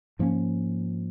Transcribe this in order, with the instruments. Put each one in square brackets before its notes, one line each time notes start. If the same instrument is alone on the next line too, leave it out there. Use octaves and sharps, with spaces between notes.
[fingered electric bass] G#2 F3 A#3 C#4